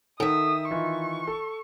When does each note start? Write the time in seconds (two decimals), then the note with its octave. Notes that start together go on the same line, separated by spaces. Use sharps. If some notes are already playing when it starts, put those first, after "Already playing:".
0.20 D#3 A4 E5 F#5 D#6
0.71 E3 D#4 F4 C#6
1.27 A4